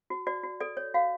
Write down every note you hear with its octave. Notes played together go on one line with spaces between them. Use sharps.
F#4
F#4 D5
F#4
A4 D5
C#5
F#4 F5